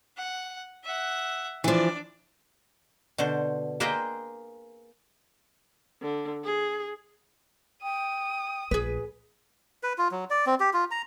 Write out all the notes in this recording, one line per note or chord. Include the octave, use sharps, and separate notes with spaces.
F#5
E5 F#5
E3 F3 D4 D5
B2 D3 C5
A#3 G#4 B4 C5 D#5 G5
D3
G#4
G5 D#6
A#1 G#4 B4
B4
F4
F#3
D5
C4
G4
F4
A#5